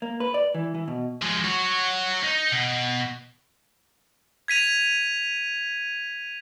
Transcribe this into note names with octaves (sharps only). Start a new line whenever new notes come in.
A#3
B4
D5
E3
E3
B2
F3 G#3
F#4 C#5
D#4
B2
G#6 B6 D#7 F7